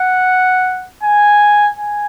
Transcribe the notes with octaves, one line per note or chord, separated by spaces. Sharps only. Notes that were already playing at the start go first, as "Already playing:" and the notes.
Already playing: F#5
G#5
G#5